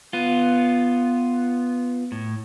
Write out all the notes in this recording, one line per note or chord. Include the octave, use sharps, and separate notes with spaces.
B3 F4
A2